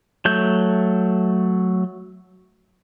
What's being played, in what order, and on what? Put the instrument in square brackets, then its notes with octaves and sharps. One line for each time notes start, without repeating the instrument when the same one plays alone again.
[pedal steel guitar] F#3 A3 G6